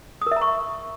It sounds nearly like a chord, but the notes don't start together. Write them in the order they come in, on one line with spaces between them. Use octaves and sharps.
D#6 A#4 E5 A#5 C#6